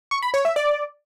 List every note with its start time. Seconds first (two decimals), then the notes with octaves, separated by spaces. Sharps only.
0.11 C#6
0.22 B5
0.34 C#5
0.45 E5
0.56 D5